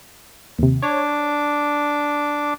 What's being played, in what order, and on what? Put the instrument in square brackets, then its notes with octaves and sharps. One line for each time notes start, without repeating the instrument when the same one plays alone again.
[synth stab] D#2 C3
[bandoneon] D4 D6 [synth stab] C#5